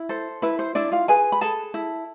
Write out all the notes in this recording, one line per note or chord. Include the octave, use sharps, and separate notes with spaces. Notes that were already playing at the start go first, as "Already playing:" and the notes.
Already playing: E4
A4 C5
E4 B4
C5
D4 E4 D5
F4 F5
G#4 B4 G#5
B5
G#4 A4 A5
E4